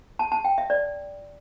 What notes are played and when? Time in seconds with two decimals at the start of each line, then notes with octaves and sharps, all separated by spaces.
0.19 A5
0.32 A5
0.45 G5
0.58 E5
0.70 D5